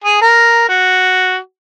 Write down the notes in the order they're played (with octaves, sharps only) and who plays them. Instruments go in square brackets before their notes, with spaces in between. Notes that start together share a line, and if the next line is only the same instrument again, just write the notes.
[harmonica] G#4
A#4
F#4